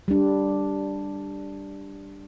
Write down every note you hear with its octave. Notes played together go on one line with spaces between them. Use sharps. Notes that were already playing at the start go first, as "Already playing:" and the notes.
G3 D4